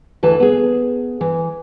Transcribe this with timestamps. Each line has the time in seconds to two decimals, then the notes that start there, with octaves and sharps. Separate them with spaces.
0.23 D2 E3 B4 A5
0.40 B3 G#4
1.21 E3